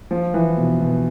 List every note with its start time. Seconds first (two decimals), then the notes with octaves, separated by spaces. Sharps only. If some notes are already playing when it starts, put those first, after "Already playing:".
0.11 F3
0.34 E3
0.57 B2
0.81 B2